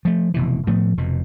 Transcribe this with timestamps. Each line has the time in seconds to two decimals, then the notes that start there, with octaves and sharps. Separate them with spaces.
0.05 F3 A3
0.34 F1 B2 E3
0.67 A2 F3 A3 B3
0.98 F1 F2 B2